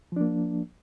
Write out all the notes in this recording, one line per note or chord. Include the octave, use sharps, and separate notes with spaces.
F3 A#3 D4